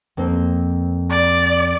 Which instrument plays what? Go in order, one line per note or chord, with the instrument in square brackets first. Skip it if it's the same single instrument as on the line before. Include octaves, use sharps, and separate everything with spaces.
[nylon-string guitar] F2 A#3 C4
[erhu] D5